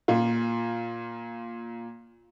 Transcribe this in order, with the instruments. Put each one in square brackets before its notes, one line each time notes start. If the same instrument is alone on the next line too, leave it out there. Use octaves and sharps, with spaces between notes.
[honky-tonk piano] A#2 F4